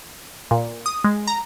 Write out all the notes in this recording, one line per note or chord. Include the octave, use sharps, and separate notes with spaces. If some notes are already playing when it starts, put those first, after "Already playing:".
A#2
D#6
G#3
A#5